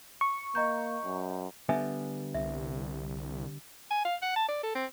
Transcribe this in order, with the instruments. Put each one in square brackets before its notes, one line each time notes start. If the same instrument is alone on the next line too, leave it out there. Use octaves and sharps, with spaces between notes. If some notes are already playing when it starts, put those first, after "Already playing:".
[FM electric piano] C#6
[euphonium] A#3 [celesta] D#5 A#5 G6
[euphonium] F#2
[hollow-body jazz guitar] D3 G3 B3 [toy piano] E5 G#5
[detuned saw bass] C2 [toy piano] E5
[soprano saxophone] G#5
F5
F#5
A5
D5
A4
C4